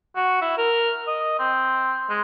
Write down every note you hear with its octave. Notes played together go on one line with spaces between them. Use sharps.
F#4
E4
A#4
D#5
C4
G#3